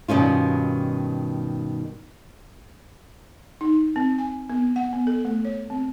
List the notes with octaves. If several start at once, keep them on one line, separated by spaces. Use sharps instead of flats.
G2 B2 D#3 C#4 F4
D#4
C4
G#5
B3
F#5
B3
A4
A3
C#5
C4